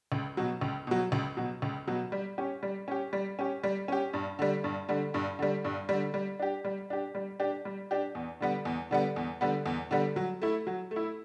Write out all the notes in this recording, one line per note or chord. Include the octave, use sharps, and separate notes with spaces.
C#2
B2 F#3
C#2
B2 F#3
C#2
B2 F#3
C#2
B2 F#3
G3
C#4 G4
G3
C#4 G4
G3
C#4 G4
G3
C#4 G4
G2
D3 G3
G2
D3 G3
G2
D3 G3
G2
D3 G3
G3
D4 G4
G3
D4 G4
G3
D4 G4
G3
D4 G4
E2
D3 G3 B3
E2
D3 G3 B3
E2
D3 G3 B3
E2
D3 G3 B3
F#3
A3 E4
F#3
A3
E4